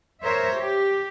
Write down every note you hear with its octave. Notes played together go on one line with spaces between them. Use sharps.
A#4 C5 C#5 E5
G4